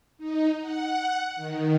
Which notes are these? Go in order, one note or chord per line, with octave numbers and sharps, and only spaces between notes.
D#4
F#5
D#3